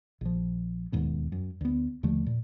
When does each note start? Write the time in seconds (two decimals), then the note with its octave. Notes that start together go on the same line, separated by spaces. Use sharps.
0.21 A#1 F3
0.92 D1 D#2 G#2 B2
1.32 F#2
1.61 D2 B3
2.03 D#2 D3 F3 A3
2.26 A#2